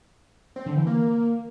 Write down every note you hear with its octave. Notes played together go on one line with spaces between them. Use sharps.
C4
D3
E3
A#3